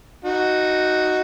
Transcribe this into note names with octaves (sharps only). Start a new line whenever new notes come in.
D#4 F#4